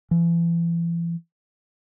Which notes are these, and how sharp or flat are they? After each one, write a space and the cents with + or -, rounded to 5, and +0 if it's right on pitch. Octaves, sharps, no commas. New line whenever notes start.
E3 +40